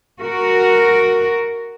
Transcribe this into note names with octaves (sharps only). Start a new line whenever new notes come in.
F#4 A#4